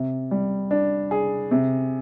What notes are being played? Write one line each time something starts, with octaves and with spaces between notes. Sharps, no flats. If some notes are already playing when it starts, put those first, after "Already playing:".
Already playing: C3
G3
D4
G#4
C3